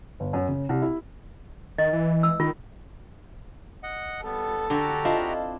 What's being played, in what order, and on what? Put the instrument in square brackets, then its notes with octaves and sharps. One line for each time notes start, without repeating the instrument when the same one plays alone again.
[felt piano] G1
F#2
C#3
C2
E4
[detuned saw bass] D#3 [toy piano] D#5
[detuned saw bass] E3
[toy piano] E6
[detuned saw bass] D#3 [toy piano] F4
[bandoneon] D#5 F#5
[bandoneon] G3 B3 [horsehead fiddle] A4
[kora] D3 [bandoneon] F#4 G4 A#5
[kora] C4 D4 E4 [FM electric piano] F4 D#5 F5